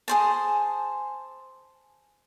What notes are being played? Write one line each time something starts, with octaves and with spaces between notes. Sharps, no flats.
G#4 C5 A5